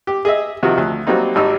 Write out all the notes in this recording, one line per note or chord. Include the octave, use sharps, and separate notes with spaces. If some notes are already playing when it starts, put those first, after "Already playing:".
G4
G#4 D#5 E5
C3 D#3 F3 F#4
D2
F#3 G3 A#3 C4 D#4
G#1 G3 D#4 E6